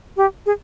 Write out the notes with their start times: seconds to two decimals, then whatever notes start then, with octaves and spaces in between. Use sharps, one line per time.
0.17 G4
0.46 G#4